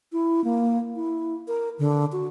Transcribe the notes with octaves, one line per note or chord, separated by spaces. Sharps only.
E4
A#3
E4
A#4
D3
F#4